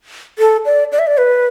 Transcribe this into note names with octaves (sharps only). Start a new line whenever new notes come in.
A4
D5
D5
E5
D5
B4